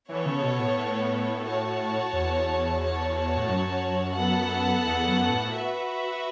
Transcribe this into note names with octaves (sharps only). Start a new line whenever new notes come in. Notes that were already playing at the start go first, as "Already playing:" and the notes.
E3 B3 A4 C#5
C#3
B2
A2
A2
F#4 C#5 A5
E2
F#4 C#5 A5
A2
F#2
B3 A4 F#5 A5
E2
F#2
A2
F#4 B4 E5